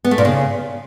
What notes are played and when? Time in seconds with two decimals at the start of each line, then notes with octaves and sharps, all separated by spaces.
0.05 B3
0.11 A3
0.18 A#2
0.25 C#3